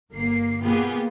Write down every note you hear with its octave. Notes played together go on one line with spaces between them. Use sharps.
G1 A#3 C7
A#3 B3 F4 G4 G#4